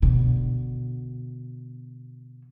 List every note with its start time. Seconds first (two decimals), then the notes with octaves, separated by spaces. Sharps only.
0.02 B2 D3